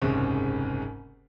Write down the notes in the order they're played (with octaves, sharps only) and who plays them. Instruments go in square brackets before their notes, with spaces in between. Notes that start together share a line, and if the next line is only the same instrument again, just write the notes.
[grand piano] F#1 C2 G#2 C4 C#4